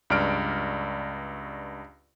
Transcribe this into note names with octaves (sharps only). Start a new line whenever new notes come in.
C#2 G2 D5 F6 D7